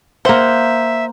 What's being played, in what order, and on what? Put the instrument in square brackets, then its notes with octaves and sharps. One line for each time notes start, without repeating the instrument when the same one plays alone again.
[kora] A#3 F#5 [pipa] C5 [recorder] E5